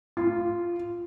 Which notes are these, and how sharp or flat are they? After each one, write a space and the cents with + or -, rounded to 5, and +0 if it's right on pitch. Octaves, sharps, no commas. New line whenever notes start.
F4 -10